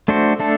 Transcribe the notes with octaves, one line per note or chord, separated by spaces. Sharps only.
A3 D4 F#4 C5
A3 D4 A4